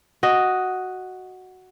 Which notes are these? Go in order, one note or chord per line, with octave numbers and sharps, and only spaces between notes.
F#4 D#5